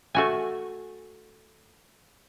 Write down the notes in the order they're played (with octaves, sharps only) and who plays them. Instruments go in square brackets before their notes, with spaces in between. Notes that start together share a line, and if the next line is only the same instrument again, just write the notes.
[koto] A3 F#4 G#5